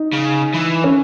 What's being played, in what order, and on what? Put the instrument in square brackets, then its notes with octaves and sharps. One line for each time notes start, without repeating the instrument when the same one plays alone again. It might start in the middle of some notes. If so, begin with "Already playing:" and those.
Already playing: [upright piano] D#4
[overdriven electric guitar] C#3
E3
[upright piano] C#4